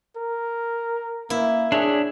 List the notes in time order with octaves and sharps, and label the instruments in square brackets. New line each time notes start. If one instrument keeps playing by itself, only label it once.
[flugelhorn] A#4
[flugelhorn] A#3 [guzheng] E4
[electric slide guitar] D4 C#5 E5 [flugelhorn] G#4